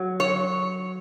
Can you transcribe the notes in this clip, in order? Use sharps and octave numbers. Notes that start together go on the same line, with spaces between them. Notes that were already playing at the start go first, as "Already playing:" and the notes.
Already playing: F#3
C#5